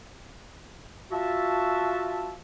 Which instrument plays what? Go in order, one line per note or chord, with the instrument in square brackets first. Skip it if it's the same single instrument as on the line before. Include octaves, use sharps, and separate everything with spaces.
[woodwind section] F4 F#4 E5 A5